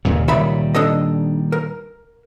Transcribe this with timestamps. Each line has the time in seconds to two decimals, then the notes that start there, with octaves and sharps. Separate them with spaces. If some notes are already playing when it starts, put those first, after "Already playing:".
0.05 D#2 A#2 C#3
0.28 C#2 A#2 D#3 G3 E5 B5
0.75 D4 A4 D#5
1.52 A#4